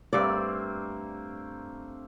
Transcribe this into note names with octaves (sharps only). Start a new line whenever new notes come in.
G2 A3 A#3 C4 D5